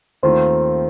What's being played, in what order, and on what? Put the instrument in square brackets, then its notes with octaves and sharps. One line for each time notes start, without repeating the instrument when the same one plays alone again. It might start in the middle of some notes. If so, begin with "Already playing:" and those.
[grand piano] D#2 D#3 A3 C4 F4 [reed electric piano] C5